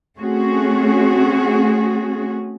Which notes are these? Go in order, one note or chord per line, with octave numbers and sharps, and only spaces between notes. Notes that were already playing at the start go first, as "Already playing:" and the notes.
A3 C4 C#4 F#4 G#4